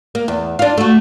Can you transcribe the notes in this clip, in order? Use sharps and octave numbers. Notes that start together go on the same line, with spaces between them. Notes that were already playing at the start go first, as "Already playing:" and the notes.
A#3
E2
D4 F4
A3 F#4